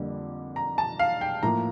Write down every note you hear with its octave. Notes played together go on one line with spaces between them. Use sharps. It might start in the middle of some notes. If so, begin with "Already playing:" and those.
Already playing: F2 D3 G3 A#3
A#5
A5
F5
G5
A2 F3 A#3 A#5